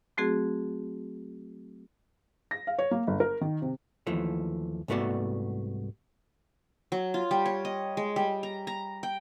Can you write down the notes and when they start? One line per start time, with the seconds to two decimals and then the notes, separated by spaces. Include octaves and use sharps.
0.18 F#3 A3 C4 F#4 G#4
2.51 A#6
2.67 F5
2.79 C#5
2.91 A#3
3.07 G1
3.20 A#4
3.41 D#3
3.62 C3
4.07 D#2 E3 F3 A3
4.88 C2 G#2 A3 B3 F#4 D5
6.92 F#3
7.14 F4
7.31 G3
7.46 C#5
7.65 D#5
7.97 G#3
8.16 G3
8.43 A#5
8.67 A#5
9.03 G5